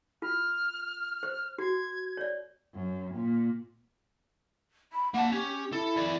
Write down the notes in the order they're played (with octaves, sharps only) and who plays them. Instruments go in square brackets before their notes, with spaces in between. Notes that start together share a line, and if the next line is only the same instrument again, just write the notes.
[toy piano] F4 [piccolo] F6
[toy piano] C5
[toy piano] F#4 [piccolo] G#6
[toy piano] C#5 D5
[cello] F#2
A#2
[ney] B5
[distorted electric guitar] A#3 A5 [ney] F#5
[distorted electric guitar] C#4 [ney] G4
[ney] E4 [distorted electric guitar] A4
[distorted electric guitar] E3 D5